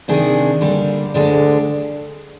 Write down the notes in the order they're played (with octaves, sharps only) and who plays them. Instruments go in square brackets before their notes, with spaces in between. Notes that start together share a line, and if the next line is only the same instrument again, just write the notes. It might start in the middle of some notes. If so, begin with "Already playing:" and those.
[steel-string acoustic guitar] C3 D#3 G#3 D4 G#4
D3 G3 A#3
D2 D3 G#3 D4